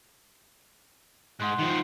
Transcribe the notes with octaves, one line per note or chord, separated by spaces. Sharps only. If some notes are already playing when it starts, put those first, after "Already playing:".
G#2 F#5 C6 F#6
D#3 F3